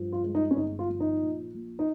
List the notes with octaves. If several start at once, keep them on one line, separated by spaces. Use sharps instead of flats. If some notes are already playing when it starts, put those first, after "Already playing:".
Already playing: G2 F3
F4
G#3
D#4
C#4
G1 D#4
F4
F3
D#4
A#2
A#1
D#4